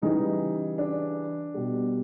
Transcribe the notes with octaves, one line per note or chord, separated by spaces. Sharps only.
C#3 E3 G3 D#4
D4
B2 G3